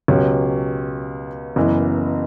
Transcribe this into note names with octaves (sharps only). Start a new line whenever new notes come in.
C#2 B2 F#3 C#4 G4
F#1 F#2 E3 B3